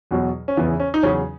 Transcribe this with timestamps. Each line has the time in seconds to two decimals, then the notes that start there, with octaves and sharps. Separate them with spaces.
0.11 E2 B2 F#3
0.48 C#4
0.57 E2 C#3 E3 B3
0.80 C#4
0.94 D#4
1.03 E2 C#3 F#3 C#4